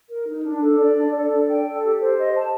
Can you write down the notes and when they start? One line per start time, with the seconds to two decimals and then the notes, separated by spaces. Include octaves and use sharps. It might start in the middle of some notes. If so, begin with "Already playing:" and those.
0.08 A#4
0.26 D#4
0.43 D4
0.60 A4
0.78 D5
0.96 D4
1.14 A4
1.30 D5
1.48 G5
1.65 A4
1.82 G4
1.99 C5
2.17 D#5
2.34 A5